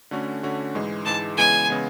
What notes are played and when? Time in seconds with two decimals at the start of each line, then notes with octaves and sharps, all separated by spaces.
0.11 D3 A3 C#4 F#4
0.43 D3 A3 C#4 F#4
0.75 G#2 E3 G#3
1.06 G#2 E3 G#3 A5
1.38 C#3 E3 G#3 B3 G#5
1.70 C#3 E3 G#3 B3